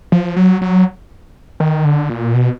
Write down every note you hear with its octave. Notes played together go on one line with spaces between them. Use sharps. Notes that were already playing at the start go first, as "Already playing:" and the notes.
F3
F#3
F#3
D#3
D3
A#2
B2